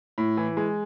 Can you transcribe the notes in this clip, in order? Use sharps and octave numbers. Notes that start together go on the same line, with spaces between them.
A2
E3
G#3